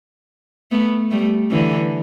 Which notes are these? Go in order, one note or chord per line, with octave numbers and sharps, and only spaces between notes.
A3 B3
G3 A3
D3 E3